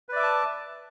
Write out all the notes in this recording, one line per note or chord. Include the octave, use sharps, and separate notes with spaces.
B4 D5 E5 A5 D6